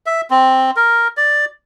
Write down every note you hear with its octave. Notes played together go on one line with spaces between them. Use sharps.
E5
C4
A#4
D5